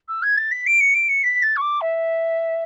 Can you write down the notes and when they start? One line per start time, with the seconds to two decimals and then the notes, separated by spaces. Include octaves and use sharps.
0.09 E6
0.23 G#6
0.37 A6
0.51 B6
0.67 D7
0.81 C#7
0.94 D7
1.09 C#7
1.24 B6
1.43 A6
1.56 C#6
1.62 D6
1.81 E5